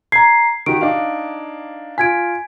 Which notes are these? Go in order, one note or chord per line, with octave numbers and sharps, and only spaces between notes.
A#5 G#6 C7
D#3 F#4 G4 D7
D4 D#4 F5
F4 G#5 G#6 B6 D7